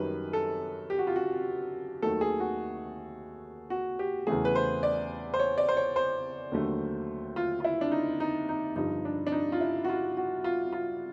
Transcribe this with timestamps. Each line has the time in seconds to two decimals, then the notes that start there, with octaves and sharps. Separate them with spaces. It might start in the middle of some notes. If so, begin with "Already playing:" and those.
Already playing: F#2 D#3 G3 B4
0.33 A4
0.90 G4
0.99 F#4
1.07 F4
1.16 F#4
2.02 D#2 D#3 F#3 A3 A4
2.21 G#4
2.40 F#4
3.70 F#4
3.99 G4
4.27 E2 C#3 E3 A3 G#4
4.45 B4
4.55 C5
4.83 D5
5.34 C5
5.40 C#5
5.58 D5
5.69 C5
5.77 C#5
5.96 C5
6.52 D#2 D3 F#3 A3
7.36 F4
7.60 F4
7.64 E4
7.81 D4
7.92 D#4
8.20 D#4
8.49 D#4
8.76 G2 D3 F3 D#4
9.05 D4
9.27 D4
9.32 D#4
9.52 F4
9.61 E4
9.84 F#4
9.89 F4
10.17 F#4
10.44 F4
10.73 F4